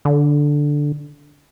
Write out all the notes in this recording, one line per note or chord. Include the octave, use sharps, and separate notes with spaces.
D3